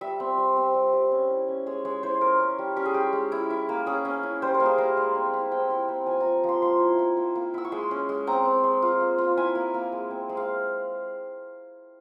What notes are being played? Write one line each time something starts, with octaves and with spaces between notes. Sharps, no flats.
G3 E5
C4
G3
C4
G3
G3
C#4
E4
C#4
G#3 C#5
G#3 C#5
E4 C5
C#4 A#4
C#4
G3
C#4 G4
G#4
G#3 G4
G#3
E4
E4
A#3
C#4 G#4
C#4
E4
G3 C5
A#4
A#3
G#4
G3 A#4
G#3
C4
E4
C4 G5
E4
C4
F3 G#5
F3 A#5
F3 C6
A#3 C6
E4
E4
A#3
A#3
E4 E6
C#6
G#3 C6
C#4
G#3
C4 A#5
C4
G#3
F4
A#3
F4
E4 G#5
A#3
A#3
G#3
C4
G#3
F5